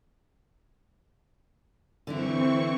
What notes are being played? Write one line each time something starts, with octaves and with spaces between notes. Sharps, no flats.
D3 E3 C4 D4 E4 C#6